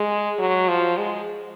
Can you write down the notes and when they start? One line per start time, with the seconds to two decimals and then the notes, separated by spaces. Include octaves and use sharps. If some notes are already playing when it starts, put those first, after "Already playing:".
Already playing: G#3
0.39 F#3
0.68 F3
0.97 G#3